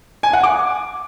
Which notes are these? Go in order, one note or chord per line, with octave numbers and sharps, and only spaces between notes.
G#5
F#5
D6